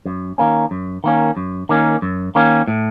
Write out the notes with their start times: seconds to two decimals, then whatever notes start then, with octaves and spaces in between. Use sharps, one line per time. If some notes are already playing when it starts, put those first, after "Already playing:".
0.06 F#2
0.38 D#3 A#3 C#4
0.71 F#2
1.04 D#3 A#3 C#4
1.37 F#2
1.69 D#3 A#3 C#4
2.02 F#2
2.35 D#3 A#3 C#4
2.68 A2